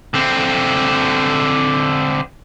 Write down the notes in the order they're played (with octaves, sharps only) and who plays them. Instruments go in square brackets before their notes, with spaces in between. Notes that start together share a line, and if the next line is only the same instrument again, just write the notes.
[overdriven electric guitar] D3 C4